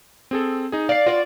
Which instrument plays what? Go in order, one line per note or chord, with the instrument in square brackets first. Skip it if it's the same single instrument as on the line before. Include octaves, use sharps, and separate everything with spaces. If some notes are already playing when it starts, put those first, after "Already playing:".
[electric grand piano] C4 G#4 A4
D#4 G#4
[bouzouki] D5 [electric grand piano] F5 C7
[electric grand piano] F4 [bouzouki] F#4 D5